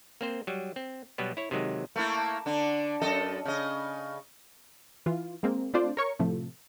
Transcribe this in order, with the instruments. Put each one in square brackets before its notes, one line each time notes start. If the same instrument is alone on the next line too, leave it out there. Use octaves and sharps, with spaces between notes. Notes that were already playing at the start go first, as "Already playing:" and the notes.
[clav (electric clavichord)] A#3 C4 C5
F#3 G3
C4
B2 F#3 G3 B3
E4 C#5
C3 D#3 F#3 G#3
[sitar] A3 A#3 E4
D3 D4
F#2 A4 D#5
C#3 D#5
[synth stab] E3 F4
G#3 A#3 C4
A3 C4 D4 F4 C5 D5
A#4 C#5 C#6
A2 C3 F3 A3